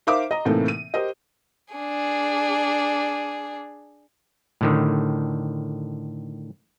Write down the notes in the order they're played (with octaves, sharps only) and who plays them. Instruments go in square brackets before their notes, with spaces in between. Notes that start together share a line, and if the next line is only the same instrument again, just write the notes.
[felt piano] D#4 A#4 C5 E5 F5 D6
D#5 A#5
A2 C3 E3 A3 A#3 D#4
D#7
G4 A#4 C5 D#5
[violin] D4 G#4
[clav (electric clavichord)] A2 D3 D#3